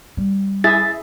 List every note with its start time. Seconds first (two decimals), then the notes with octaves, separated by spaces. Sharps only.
0.17 G3
0.64 E4 G#4 E5 A6